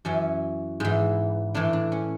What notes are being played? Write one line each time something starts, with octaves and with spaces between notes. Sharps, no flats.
F#2 E3 C#4
G#2 E3
A2 E3 D4
D4
C#4